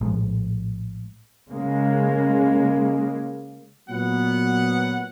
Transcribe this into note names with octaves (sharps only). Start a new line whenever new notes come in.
A#1 A2 G#3
C#3 G#3 A#3
A#2 F#3 B3 F#5